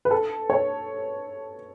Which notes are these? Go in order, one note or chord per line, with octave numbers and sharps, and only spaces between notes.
B4
A4
C#5